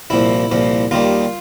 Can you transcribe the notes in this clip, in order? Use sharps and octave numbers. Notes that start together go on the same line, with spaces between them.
C2 A#2 F3 E4
C2 A#2 F3
D#2 D#3 G3 F4